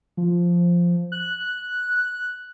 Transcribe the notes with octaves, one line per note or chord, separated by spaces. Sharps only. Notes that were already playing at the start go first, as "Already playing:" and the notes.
F3
F#6